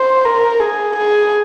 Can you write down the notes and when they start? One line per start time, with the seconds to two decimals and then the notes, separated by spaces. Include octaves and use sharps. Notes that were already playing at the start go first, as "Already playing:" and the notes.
Already playing: C5
0.25 A#4
0.60 G#4
0.96 G#4